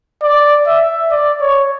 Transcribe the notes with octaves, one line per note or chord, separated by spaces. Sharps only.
D5
E5
D5
C#5